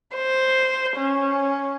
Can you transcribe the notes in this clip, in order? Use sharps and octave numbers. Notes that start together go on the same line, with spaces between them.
C5
C#4